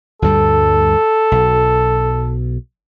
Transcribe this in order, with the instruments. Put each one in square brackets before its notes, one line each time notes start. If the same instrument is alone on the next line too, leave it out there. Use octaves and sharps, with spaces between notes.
[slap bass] D2 G2 G3 [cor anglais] A4
[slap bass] B1